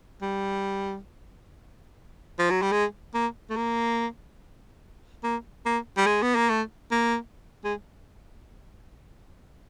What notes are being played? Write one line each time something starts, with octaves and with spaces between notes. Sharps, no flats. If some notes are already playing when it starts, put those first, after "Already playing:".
G3
F3
F#3
G3
G#3
A#3
A3
A#3
A#3
A#3
G3
G#3
B3
A#3
A3
A#3
G#3